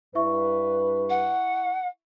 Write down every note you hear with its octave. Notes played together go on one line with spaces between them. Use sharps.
G2 E4 B4 E5 C#6
F#5